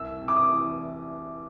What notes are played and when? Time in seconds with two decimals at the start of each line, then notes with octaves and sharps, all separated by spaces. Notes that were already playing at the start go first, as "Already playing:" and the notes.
Already playing: C2 E6
0.21 C3
0.28 D6
0.36 D#6
0.51 E3